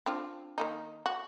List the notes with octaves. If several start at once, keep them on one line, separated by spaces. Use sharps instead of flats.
C4 D4 F4
D#3 A#3 D#4
F#4